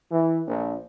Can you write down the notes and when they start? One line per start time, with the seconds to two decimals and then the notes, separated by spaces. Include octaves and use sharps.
0.11 E3
0.46 A#1